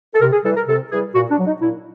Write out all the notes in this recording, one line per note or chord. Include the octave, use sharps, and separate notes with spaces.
A4
C3 A#4
G#4
E3 G3 A4
A#4
C3 A4
E3 G3 G#4
A#2 F#4
D4
F#3
D#4
A#2 E4